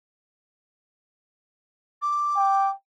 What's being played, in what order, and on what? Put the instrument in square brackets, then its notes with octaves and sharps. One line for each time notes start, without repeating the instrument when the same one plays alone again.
[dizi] D6
[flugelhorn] G5